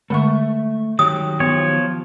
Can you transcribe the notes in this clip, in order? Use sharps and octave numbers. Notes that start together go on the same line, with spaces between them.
D3 G#3 A3 E5 C#6
D#3 F#3 G4 D#6
F3 B3 C#5